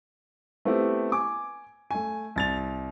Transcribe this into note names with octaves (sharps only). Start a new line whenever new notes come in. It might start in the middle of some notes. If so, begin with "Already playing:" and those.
A3 B3 C4 E4 G4
G#5 D6
A3 G#5
C2 A6 F7